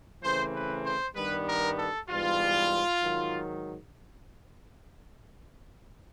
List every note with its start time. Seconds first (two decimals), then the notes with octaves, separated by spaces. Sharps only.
0.22 C#3 E3 A3 C4 C5
0.53 B4
0.84 C5
1.15 G2 D#3 G3 B3 B4
1.46 A#4
1.77 A4
2.08 G#2 E3 G3 B3 F4
3.01 G#2 D#3 F#3